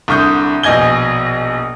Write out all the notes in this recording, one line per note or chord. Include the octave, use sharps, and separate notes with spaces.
C2 D3 C#6 D#6 G6
A#1 B2 D#5 G#5 G#6 G7